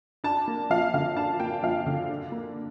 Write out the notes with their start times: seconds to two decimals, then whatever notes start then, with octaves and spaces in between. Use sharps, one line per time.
0.24 D4 A5
0.48 A#3
0.70 F3 F5
0.94 D3 F5
1.17 D4 A5
1.40 A#3 G5
1.63 F3 F5
1.86 D3
2.09 D4
2.32 A#3